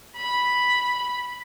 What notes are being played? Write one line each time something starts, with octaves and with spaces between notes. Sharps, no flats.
B5